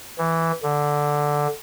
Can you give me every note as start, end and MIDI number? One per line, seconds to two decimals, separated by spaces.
0.18 0.52 52
0.63 1.47 50